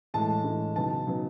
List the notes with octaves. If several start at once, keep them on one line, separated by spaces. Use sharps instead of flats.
A2 E3 G#3 A5
A2 E3 G#3
C#3 F#3 B3 D#4 A5
C#3 F#3 B3 D#4